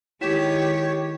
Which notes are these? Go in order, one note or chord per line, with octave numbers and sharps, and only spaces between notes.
D#3 G#3 E4 G4 C#5 B6 E7